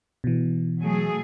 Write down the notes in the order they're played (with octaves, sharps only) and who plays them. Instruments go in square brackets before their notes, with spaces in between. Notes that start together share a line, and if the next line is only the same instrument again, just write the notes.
[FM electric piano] B2 E3
[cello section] F#3 A3 G#4